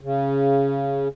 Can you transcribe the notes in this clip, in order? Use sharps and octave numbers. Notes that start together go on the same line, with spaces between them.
C#3